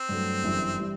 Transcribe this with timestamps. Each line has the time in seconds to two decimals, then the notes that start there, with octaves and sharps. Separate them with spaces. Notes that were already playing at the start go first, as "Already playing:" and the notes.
Already playing: C4
0.09 G2 F#3 A3
0.43 G1 F#2 E3 G3
0.79 E3 G3